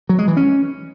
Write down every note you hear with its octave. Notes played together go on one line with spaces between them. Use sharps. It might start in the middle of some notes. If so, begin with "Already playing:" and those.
F#3
G#3
E3
C#4